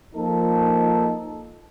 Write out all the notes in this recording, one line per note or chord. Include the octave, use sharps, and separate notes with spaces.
F3 A#3 D#4 F4 A4